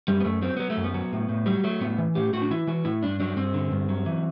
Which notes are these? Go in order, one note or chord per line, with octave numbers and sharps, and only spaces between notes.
F#2 G3
B3
F#2 A3
F#3 C4
F#3 B3
A3
F#2
B3
F#3
A2
A2
F#3 G3
F#3 A3
A2 B3
E3
A2 G4
A2 F#4
D4
E3 E4
E3 F#4
A2 E4
G2 D4
F#3 D4
G2 C4
D3
G2
F#3
E3